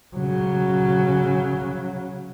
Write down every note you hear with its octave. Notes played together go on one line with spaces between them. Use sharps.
C#3 F#3